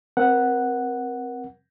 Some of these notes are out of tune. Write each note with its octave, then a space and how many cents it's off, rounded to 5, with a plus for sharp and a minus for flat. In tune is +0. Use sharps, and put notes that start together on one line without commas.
C4 +0 A#4 +30 F#5 +0